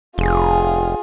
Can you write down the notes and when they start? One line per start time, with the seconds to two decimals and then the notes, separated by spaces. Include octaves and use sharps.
0.18 F1 F4 G#4